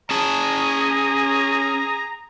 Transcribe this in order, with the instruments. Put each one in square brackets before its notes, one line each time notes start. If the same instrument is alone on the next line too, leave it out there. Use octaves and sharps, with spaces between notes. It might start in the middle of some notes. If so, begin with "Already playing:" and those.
[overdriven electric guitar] C#4 A5 [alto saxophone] G#4 [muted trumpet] A#5